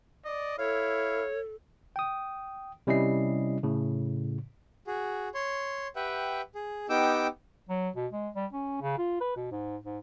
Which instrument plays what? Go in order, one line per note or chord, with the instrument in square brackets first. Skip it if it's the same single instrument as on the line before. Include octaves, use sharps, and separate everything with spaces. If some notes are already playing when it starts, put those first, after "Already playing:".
[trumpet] D5 [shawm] D#5
[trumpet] E4 [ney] A4 [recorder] C#5 [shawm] F5
[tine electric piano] G5 D#6
C3 G3 C#4 E4 D#5 C7
A2 C#3
[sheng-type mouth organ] F#4 G#4
C#5 C6
G4 B4 E5 F#5 G5
G#4
B3 D#4 G4 G5 D6 E6
[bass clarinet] F#3
B2
G#3
G3
C#4
C#3
F4
B4
B2
G#2
G#2